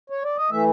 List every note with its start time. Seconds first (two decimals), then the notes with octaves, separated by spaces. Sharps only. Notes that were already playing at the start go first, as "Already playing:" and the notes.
0.10 C#5
0.24 D5
0.36 D#5
0.50 E3 A3 E5